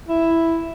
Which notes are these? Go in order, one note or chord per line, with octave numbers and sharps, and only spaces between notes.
E4